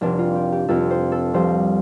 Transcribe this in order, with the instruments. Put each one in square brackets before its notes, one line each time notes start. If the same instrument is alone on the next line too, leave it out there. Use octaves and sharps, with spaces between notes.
[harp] F1 F2 C3 D4
F4
G4
G4
F1 F2 C3 A4
C5
A4
C2 C3 F3 C5